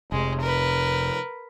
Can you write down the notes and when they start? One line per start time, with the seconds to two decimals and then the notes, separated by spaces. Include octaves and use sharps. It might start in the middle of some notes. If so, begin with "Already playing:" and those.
0.12 F1 C3 G#3
0.41 A#4 B4